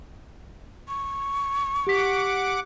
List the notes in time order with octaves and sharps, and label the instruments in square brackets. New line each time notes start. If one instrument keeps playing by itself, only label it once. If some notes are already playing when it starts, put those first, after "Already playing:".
[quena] C#6
[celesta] G4 B6 [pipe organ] F#5 D6